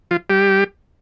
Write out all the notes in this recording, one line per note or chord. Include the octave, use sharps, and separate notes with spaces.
F3 F4
G3 G4